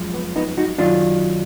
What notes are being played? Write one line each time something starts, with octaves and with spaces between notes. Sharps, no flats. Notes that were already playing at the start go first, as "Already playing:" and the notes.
Already playing: F#2 F3 G#3
B3
B3 D#4
D#4 F#4
F#2 D#3 F#3 D4 F4